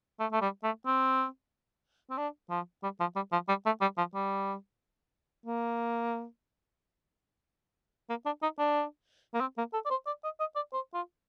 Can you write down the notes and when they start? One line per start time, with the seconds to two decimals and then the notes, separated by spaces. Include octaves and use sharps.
0.20 A3
0.32 A3
0.42 G3
0.64 A3
0.86 C4
2.10 C4
2.18 D4
2.50 F3
2.83 G3
3.00 F3
3.16 G3
3.32 F3
3.49 G3
3.66 A3
3.81 G3
3.98 F3
4.15 G3
5.46 A#3
8.09 A#3
8.26 D4
8.42 D#4
8.59 D4
9.34 A#3
9.40 C4
9.58 A#3
9.73 A4
9.85 D5
9.90 C5
10.07 D5
10.24 D#5
10.40 D#5
10.56 D5
10.73 C5
10.94 F4